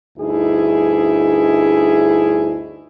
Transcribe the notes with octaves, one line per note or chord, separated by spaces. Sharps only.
D2 G2 D#4 E4 G#4